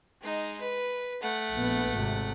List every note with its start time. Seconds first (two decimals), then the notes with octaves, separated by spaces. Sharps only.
0.21 G#3 D#4
0.61 B4
1.21 A3 F#5
1.52 A#1 B3
1.92 G#1 C3